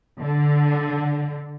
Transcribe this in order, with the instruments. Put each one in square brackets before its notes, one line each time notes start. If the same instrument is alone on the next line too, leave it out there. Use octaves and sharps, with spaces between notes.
[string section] D3